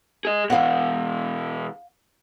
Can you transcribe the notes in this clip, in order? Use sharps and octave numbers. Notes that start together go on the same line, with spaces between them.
G#4 D#5
B2 E3 F5 F#5